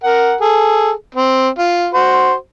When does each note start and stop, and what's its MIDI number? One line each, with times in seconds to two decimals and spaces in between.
0.03 0.36 70
0.03 0.36 78
0.41 0.91 68
0.41 0.91 69
1.15 1.48 60
1.59 1.88 65
1.94 2.34 66
1.94 2.34 72